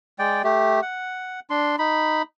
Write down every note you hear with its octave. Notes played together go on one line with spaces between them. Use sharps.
G#3 D5 G5
A3 G4
F#5
D4 C6
D#4 B5